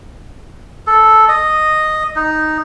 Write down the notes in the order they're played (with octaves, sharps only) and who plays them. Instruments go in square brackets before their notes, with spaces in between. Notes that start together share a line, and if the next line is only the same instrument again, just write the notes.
[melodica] A4
D#5
D#4